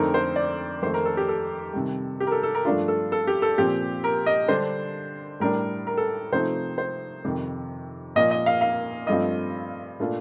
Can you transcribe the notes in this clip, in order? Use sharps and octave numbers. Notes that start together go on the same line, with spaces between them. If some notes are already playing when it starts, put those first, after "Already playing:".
Already playing: F2 D3 A3 C4 D#4 A#4
C5
D5
F2 D#3 A3 C5
A#4
A4
G4
A4
C3 D#3 G3
G4
A#4
A4
A4
A#4
G2 F3 A3 D4 F4
A4
A4
G4
A4
A#2 F3 C4 G4
A#4
D#5
D3 G3 D4 C5
A2 G3 D4 A#4
A#4
A4
C3 F3 A3 D#4 C5
C5
F2 C3 D#3
A#2 F3 A#3 D#5
D#5
F5
F5
G2 F3 A3 C4 F4 D#5
A#2 A3 D4 F4